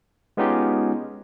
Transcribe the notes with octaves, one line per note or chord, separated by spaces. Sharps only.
G#3 B3 C#4 D#4 F4 G4